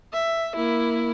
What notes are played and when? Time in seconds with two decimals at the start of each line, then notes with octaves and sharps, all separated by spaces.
0.13 E5
0.56 A#3 E4